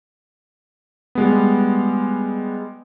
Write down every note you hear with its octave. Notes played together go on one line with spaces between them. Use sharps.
G3 G#3 B3